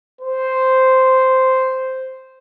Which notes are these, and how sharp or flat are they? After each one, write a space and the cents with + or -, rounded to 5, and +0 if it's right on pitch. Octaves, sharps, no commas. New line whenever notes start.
C5 -5